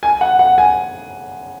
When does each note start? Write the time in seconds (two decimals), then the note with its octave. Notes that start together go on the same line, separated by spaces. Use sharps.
0.03 G#5
0.21 F#5
0.39 F#5
0.58 G#5